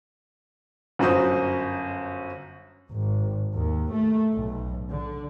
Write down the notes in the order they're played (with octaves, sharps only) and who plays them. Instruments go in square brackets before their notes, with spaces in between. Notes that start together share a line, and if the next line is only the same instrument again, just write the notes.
[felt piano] G1 F#2 F#4 C5 D#6
[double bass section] G#1
D#2
A3
B1
D3